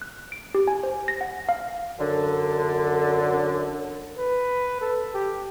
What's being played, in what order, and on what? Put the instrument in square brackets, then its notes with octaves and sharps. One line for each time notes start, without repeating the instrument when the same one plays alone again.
[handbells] F#6
D7
G4
G#5
C5
A#6
F#5
F5
[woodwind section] F#2 D3
[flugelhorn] B4
A4
G4